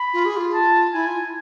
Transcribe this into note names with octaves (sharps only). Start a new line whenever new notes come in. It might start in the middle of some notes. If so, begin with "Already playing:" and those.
Already playing: B5
F4
G#4
F4
A5
E4 G#5
F4